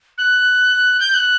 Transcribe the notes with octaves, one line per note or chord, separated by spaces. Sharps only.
F#6
G6
G6
F#6